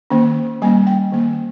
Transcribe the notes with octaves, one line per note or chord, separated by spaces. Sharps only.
D#3 A#3 C#4
G3 A#3 C#4 G#5
G5
D#3 A#3 C#4